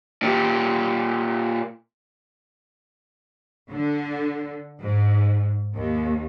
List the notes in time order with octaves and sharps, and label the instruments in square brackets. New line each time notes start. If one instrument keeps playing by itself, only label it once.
[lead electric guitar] A#2 G4
[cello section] D3
G#2
D#2